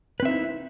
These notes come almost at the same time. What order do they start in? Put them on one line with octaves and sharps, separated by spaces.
B4 C4 E5 D#4 E4